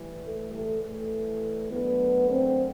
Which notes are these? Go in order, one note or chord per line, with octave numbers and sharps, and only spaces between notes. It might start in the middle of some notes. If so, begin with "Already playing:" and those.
Already playing: A2 E3 G3
A3 A4
A2 E3 G3 A3 A4
A3 A4
F#2 D3 F#3 A3 B3 B4
C4 C5